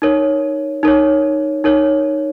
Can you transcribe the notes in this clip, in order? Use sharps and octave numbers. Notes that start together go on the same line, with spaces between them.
D#4 A#4 C#5
D#4 A#4 C#5
D#4 A#4 C#5